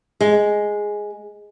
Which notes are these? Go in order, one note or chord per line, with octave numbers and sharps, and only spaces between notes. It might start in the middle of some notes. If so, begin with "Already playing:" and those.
G#3